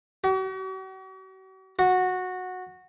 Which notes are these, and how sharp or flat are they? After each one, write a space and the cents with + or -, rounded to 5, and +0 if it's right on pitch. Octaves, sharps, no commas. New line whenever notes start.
F#4 +45
F#4 -10